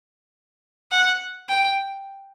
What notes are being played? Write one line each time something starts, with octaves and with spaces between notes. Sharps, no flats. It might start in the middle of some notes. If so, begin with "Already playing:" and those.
F#5
G5